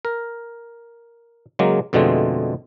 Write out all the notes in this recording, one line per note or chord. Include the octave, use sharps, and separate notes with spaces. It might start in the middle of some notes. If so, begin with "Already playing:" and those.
A#4
C#3 F#3 G#3 A#3
F2 B2 D3 G#3 A3 C4